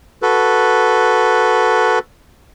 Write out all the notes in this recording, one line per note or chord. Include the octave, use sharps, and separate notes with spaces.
F#4 A4 B4